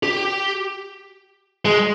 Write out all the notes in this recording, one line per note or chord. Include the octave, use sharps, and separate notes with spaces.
G4
G#3